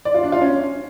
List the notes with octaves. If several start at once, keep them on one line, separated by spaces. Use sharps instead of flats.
D5
F4
D4
F4
C#4